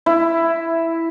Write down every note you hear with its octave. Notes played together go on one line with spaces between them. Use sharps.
E4